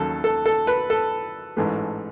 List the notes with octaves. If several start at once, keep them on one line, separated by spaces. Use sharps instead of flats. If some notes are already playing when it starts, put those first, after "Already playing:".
Already playing: D#2 C#3 F#3 A4
A4
A4
B4
A4
A1 G#2 E3 A3